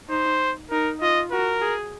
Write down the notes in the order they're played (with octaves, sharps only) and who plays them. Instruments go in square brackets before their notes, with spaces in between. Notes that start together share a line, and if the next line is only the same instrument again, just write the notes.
[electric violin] D#4 [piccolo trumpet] C5
[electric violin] D#4 [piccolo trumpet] A#4
[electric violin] F4 [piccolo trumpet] D#5
[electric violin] F#4 [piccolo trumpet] A#4
[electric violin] G#4